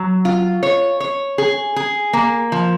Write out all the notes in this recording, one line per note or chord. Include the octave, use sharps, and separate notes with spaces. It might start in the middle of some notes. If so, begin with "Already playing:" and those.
Already playing: F#3
F4
C#5
C#5
G#4
G#4
A#3
F3